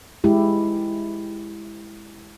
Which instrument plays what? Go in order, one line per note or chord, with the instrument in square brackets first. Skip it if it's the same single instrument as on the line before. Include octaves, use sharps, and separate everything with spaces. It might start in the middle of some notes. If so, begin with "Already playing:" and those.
[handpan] G#3 E4 G4